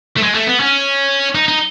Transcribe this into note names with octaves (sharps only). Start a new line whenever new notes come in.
A3
G#3
A3
B3
C#4
D#4
D#4